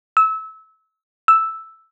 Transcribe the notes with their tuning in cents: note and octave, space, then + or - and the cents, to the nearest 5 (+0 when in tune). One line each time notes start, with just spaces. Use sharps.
E6 -25
E6 +0